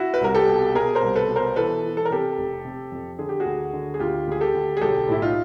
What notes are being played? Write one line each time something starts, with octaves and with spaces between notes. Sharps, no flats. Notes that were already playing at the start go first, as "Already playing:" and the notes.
Already playing: E4 F#4
B4
C2 A#4
G4 A4
B2
B2 G#4 A#4
A#4 C5
C2
A4 B4
B2
A#4 C5
E3 A4 B4
E3
A4
A#4
C3 G4 A4
F1
C3
F2
D3 G#4
G4
F#4 G#4
D2
D3
G#4
D2 F4 G4
D2 G#4
G4 A4
D2
G#4
B1 G4 A4
A2 E4
D#4 F4